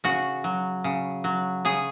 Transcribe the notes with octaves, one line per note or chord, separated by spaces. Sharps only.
C#3 F#4
F#3
C#3
F#3
C#3 G#4